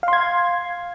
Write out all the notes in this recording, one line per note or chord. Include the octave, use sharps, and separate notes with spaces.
F5 C6 G#6